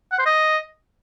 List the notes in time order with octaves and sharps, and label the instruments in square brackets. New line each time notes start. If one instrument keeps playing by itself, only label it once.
[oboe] F#5
C5
D#5